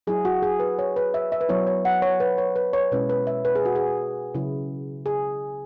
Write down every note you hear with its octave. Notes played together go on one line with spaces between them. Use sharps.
F#3 E4 G#4
F#4
G#4
B4
C#5
B4
E5
E5
B4
F#3 B3 E4 C#5
C#5
F#5
C#5
B4
C#5
B4
C#5
B2 G#3 C#4 E4 B4
B4
E5
B4
G#4
F#4
G#4
C#3 F#3 E4
G#4